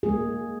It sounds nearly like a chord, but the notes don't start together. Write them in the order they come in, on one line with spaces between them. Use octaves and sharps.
G#4 A#3 G#3